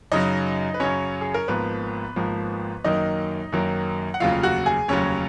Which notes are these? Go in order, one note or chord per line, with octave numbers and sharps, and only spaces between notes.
F#2 C#3 F#3 D#4 D#5
B4
F#2 C#3 F#3 C#4 C#5
G#4
A#4
G#1 G#2 F3 A#3 B3 B4
G#1 G#2 F3 A#3
F#2 D#3 F#3 A#3 D#4 D#5
F#2 D#3 F#3 A#3
F#5
F1 D#2 C#3 F#3 F4 F5
F#4 F#5
G#4 G#5
F1 D#2 C#3 F#3 C#4 C#5